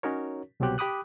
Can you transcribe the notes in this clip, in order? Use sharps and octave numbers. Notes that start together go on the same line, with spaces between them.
C#4 D#4 F#4 A#4 C#5
C2 B2 F#3 C4 G4 F#6
G4 G5 B5 D6 D#6 F#6